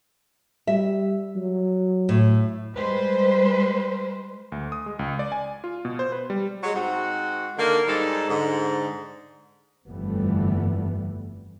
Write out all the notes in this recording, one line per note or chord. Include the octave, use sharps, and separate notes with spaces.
G3 E5
F#3
A2
G3 G#3 B4 C5
D2
D#6
G#3
C#2
D5
G#5
F4
B2
C5
B4
G3
F#3 G#3
G#2 C4 F#4
D3 D#3 A#3
G#2 G3 G#3 D#4 A4
G#2 D3
G1 F2 E3 G3 A3 B3